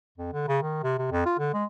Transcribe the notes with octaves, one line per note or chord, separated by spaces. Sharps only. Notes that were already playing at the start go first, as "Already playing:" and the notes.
F2
D3
C#3
D#3
C3
C3
F2
F4
D3
G#3